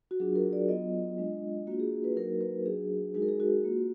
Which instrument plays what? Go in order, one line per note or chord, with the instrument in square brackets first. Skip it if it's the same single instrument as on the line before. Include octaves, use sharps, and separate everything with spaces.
[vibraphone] F#4
F#3 D4 F4 G#4
A#4
D5
F#3 B3 F4 D#5
G#3 D4 F4
A#3 D4 F4 F#4
G#4
B4
F#3 A#3 D#4 F#4 A#4
B4
F#3 D4 F#4 G#4
G#3 D#4 F#4 G#4
A#4
G#4
F#4
A#3 F4